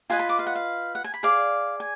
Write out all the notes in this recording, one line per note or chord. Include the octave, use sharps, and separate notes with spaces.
F4 B4 D#5 G#5
B5
D6
F5
F#5
F5
F#5
G#5
B5
G#4 D5 F5
G#5